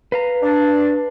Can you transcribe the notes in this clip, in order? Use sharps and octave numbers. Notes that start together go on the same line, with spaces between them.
B4 F5 A#5
D4